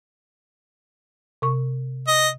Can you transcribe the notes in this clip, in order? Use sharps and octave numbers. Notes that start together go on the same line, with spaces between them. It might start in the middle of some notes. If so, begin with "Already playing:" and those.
C3 C#6
D#5